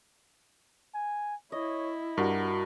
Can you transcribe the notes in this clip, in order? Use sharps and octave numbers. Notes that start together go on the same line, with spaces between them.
G#5
E4 C#5 D#5
G2 D4 F#4 A#4